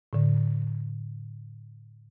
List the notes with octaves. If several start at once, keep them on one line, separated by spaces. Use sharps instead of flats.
A2 D3